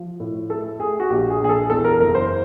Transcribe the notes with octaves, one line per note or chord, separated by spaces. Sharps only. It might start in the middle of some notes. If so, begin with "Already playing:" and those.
Already playing: F3
A2
A3 A4
A3 G#4
F#4
A#1 G4
G#4
A#1 G#4
A4
E2 A4
A#4
F#1 A#4
C5